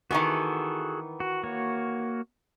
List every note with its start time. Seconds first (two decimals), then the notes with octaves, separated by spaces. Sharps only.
0.11 D#3 E3 B3 F#4 G#4 A4
1.20 F#4
1.44 A#3 F#4 C#5